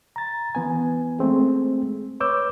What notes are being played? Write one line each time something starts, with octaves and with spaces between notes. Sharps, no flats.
A#5 A6
E3 B3 G#5
G#3 A3 C4 G#4
B4 C#5 D6 E6 G6